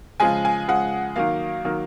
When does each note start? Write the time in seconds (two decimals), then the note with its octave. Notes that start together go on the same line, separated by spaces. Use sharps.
0.20 C#3 F3 G#3 G#5
0.45 G#5
0.68 C#3 F3 G#3 F#5
1.16 D#3 F#3 A#3 F5
1.65 D#3 F#3 A#3